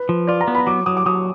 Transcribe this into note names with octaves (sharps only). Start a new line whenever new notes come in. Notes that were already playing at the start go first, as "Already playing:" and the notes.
Already playing: B4
F3
F4 D5
A#5
B3
B5
F#3 D6
F#3 D#6
D6
F#3 D#6